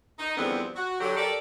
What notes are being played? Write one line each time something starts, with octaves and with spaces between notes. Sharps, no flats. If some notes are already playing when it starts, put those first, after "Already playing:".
D#4
E2 D3 F3 G3 B3 C4
F#4
D3 F#3 G4
G4 A4 A#4 D5